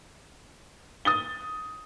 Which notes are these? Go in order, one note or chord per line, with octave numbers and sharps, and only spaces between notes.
D#6 A6 G7